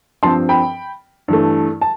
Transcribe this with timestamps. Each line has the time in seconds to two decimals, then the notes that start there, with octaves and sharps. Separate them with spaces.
0.23 G2 F3 C4 A5 C6
0.49 G5 B5
1.28 G2 E3 A3
1.81 A5